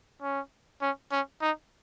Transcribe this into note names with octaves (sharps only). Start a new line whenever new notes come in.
C#4
C#4
C#4
D#4